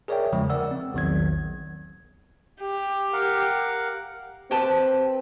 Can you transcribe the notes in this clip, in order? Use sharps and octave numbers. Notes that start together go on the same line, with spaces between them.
G#4 A#4 C#5 D5 E5 G5
E2 C#3 F3 G#3
A#4 D5 F#5 E6
C4
A#1 E2 D#3 F#3 G#6
G4
A#4 F5 F#5
C4 G4 B4 A5